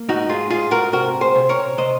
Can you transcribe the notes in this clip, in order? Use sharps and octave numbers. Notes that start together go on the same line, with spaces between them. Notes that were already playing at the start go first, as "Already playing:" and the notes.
Already playing: A#3
G#2 D#4 F#4
F4 G#4
G#2 F4 G#4
F#4 A#4
C3 F#4 A#4
G#4 C5
C3
A#4 C#5
C3 C5 D#5